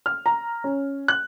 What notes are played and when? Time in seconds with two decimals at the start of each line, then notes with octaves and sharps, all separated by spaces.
0.06 F6
0.26 A#5
0.64 C#4
1.08 F#6